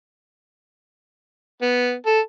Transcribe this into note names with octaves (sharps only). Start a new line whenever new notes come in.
B3
A4